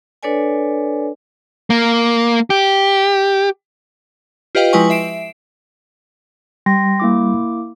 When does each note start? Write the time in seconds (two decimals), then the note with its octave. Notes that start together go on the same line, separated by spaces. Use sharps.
0.23 D4 A4 B4 C#5 D5 G#5
1.70 A#3
2.50 G4
4.55 F4 G4 B4 D#5 F5 G5
4.73 F3 G#3 E4 B4 G#5 C#6
4.90 E5 C7 D7 E7
6.66 G3 G5 C6 A#6
7.00 A#3 E4 D6